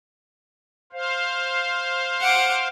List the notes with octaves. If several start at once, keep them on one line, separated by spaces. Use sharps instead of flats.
C5 F5
F#5 D6